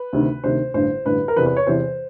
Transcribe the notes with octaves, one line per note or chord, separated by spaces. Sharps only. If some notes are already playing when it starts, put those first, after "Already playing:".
Already playing: B4
D2 C3 D#3
D2 C3 D#3 C5
A1 G2 D3 C5
A1 G2 D3 B4
A#4
E2 C3 E3 B4
B4
C#5
E2 C3 E3 C5